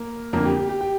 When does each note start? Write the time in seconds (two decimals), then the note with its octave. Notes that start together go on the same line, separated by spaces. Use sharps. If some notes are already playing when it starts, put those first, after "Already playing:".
Already playing: A#3 A#4
0.33 F2 D3 A#3 A#4
0.45 G4
0.57 G4
0.69 G4
0.81 G4 G5